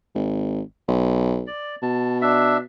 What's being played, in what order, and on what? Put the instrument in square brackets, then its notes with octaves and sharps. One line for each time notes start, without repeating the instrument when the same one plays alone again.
[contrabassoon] G#1
B1
[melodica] D5
[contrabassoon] B2 [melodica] A5
[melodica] D4 E5